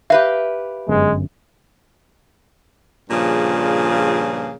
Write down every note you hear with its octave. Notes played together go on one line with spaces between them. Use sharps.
G4 B4 E5 F5
G1 F#2 G#3
G2 A#2 C#3 F3 G#4